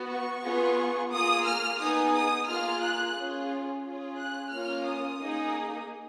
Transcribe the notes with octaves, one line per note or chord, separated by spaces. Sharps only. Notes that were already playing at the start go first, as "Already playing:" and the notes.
Already playing: B3 F#4
C#6
B3 F4 G#4
A#3 F4 G#4 D#6
F6
B3 D#4 G#4 D#6
D#6
A#3 F4 G#4 F6
F#6
C#4 F4 G#4
C#4 F4 G#4
F#6
A#3 C#4 F4 F6
D#6
A#3 D#4 G#4